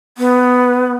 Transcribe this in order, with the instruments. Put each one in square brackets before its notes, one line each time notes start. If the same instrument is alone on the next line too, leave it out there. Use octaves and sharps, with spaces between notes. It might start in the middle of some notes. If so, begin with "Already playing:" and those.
[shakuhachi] B3